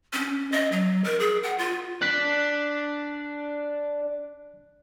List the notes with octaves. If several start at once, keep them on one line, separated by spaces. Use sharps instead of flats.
C#4
D#5
F#3
A#4
G#4
F#5
F4
D4 F#6 B6